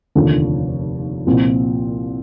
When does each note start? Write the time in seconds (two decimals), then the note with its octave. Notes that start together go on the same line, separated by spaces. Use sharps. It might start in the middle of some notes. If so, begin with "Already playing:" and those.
0.15 F1 D#2 D3 F3
1.26 C2 A#2 F3 C4